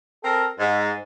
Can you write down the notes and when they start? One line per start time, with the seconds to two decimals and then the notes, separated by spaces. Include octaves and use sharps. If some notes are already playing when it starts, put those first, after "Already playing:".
0.24 C4 A4 A#4
0.59 G#2